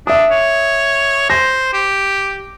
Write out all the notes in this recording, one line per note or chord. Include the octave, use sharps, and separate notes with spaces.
D4 E5 D#6
C#5
C5 A#6
G4